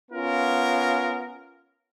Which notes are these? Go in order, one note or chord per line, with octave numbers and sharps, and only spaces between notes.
B3 C#4 F4 A#4